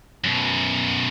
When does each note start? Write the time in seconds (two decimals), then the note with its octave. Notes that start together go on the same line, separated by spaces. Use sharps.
0.24 F#2 B2